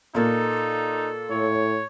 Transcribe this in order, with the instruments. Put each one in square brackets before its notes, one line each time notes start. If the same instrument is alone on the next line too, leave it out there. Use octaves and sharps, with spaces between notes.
[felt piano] A#2 A#3 [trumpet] D#4 [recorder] A4
[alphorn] A2 [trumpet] C#5